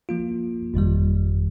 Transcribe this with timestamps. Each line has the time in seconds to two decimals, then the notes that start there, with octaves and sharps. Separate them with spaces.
0.09 F3 A#3 F4
0.74 G1 F2 D#3 G3